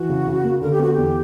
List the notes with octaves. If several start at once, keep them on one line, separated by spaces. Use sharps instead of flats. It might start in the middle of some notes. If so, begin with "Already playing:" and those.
Already playing: E3 F#4
C#3
C#3
A#3
D3 A#4
G4
B3 F#4
G4
E2